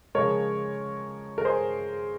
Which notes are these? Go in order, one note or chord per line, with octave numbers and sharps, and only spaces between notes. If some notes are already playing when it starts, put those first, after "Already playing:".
C#3 F3 G#3 A#4 C#5
A#4
G#4 C5